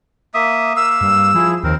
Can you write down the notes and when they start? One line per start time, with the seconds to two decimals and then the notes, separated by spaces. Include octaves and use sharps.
0.34 A#3 E5 D#6
0.76 A#3 F5 E6
1.01 G2
1.35 F3 E4 G#4
1.64 D#2 C4 A#4